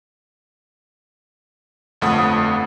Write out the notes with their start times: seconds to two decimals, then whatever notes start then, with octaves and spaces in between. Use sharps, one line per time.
2.01 G1 F2 A3 F#5 D#6